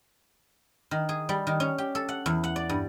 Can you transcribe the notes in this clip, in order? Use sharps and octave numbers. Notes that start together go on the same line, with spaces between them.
D#3
G#4
G3
D#3
C#4
G4
A4
F#5
E2
F#5
D5
G2